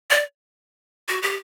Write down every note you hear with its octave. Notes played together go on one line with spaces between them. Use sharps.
D5
F#4
G4